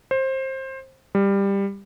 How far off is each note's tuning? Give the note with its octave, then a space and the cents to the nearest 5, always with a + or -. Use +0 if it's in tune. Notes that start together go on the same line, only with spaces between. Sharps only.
C5 +20
G3 +15